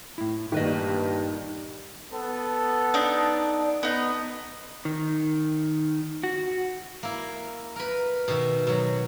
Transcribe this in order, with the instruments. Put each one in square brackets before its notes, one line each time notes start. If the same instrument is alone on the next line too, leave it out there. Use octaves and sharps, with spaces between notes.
[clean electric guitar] A2 E4
[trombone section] G2 [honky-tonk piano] A#2 D#3 [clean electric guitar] E4 B4 D#5
[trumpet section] B3 A4
[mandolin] D4 D#4
B3 D#4
[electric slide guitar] D#3
F#4
[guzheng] A#3 E4
A#4 B4
B2 D#3 E5
B2 F#3